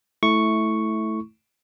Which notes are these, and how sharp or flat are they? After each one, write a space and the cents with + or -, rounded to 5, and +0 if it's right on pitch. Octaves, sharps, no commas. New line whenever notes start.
A3 -10 E4 -15 C#6 +0